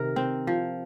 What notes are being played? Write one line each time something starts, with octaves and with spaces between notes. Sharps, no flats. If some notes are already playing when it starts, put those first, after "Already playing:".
Already playing: C3 D#3 A#4
C4
F3